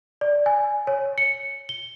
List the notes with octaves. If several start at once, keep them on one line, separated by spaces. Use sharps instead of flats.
D5
G#5
C#5
C#7
G7